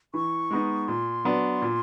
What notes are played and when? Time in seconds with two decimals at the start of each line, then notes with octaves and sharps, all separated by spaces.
0.14 E3 C#6
0.51 G#3 B3 D#4
0.88 A#2 C6
1.25 F#3 B3 D4
1.62 A#2